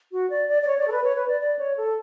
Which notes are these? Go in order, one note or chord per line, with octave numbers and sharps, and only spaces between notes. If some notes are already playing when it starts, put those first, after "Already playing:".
F#4
D5
D5
D5
C#5
D5
A4
B4
C#5
B4
D5
D5
C#5
A4